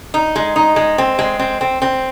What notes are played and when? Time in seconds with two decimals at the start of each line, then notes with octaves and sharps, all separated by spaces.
0.14 D#4
0.36 G#3
0.56 D#4
0.76 G#3
0.98 C4
1.19 G#3
1.39 C4
1.61 C4
1.82 C4